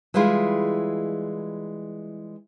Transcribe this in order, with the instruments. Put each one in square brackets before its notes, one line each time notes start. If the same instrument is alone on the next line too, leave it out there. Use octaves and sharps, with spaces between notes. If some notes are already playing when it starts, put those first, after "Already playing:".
[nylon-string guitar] E3 G3 G#3 E4 F4 G#4